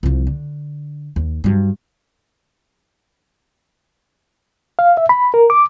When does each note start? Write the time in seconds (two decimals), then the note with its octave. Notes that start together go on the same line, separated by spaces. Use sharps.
0.03 C2 F3
0.27 D3
1.16 D#2
1.44 G2 F#3
4.79 F5
4.97 E5
5.09 B5
5.34 A#4
5.50 D6